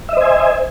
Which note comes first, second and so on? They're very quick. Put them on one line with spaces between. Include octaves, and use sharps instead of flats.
E5 D#5 C5 G#5